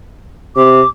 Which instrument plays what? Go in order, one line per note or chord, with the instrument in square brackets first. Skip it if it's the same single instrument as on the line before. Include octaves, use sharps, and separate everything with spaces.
[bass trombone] C3 [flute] D6